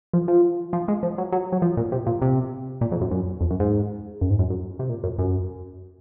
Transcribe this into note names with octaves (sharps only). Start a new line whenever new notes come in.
F3
F3
F3
G#3
F3
F#3
F#3
F#3
F3
A#2
C3
A#2
C3
A#2
F2
F#2
F#2
F2
F#2
G#2
F#2
G#2
F#2
F#2
C3
A#2
F#2
F#2